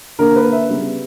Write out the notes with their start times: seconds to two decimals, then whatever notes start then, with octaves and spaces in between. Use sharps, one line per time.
0.19 D3 A#3 A#4
0.36 B4
0.52 E5
0.69 C#3 G3 B3